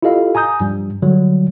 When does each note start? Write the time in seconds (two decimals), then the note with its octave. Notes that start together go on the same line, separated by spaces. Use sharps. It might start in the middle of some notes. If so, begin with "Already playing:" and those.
0.02 E4 F4 G4 A4 D#5 F5
0.35 G#5 A#5 D#6 G6
0.61 G2 F3 G3
1.02 D3 F#3 G3